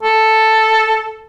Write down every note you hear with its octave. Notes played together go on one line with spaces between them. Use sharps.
A4